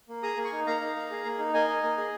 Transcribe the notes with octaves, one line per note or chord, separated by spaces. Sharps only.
A#3
G#4 A#5 D#6
A#3
G#5 C#6
D#4
A#3 F5 A#5
D#4
A#3
G#4
A#3
D#4
A#3 D#5 G#5
D#4
A#3
G#4